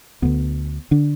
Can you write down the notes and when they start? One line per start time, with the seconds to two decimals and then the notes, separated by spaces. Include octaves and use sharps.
0.22 D2 D3 B3
0.91 D3 D4